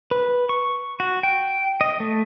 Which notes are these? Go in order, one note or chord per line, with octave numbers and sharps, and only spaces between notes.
B4
C#6
F#4
G5
D#5
A3